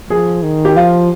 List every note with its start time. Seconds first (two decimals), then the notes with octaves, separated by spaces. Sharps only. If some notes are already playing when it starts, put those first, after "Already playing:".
0.10 F3 G#4
0.43 D#3
0.65 G4
0.76 F3 F4